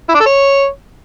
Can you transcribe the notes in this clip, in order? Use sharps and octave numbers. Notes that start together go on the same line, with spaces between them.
E4
D4
A4
C#5